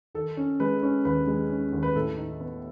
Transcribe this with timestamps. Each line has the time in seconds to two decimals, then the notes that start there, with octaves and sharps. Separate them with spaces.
0.15 D#3 A4
0.37 C#4
0.60 G#3 B4
0.83 C#4
1.05 D#2 B4
1.27 G#3
1.50 C#4
1.73 D#2
1.83 B4
1.95 A2 A4
2.17 D#4
2.41 B3